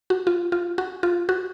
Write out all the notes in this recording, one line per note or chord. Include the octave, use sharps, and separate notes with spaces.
F#4
F4
F4
F#4
F4
F#4